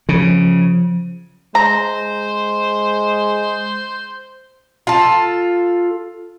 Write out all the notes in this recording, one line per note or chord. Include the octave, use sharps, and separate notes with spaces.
C#3 F3
G#3 C5 A#5
F4 A4